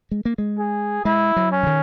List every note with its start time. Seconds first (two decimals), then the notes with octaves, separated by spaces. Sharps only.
0.11 G#3
0.25 A#3
0.38 G#3
0.58 G#4
1.05 G#3 E4
1.36 F#3
1.51 C#4
1.63 C#3
1.67 D#3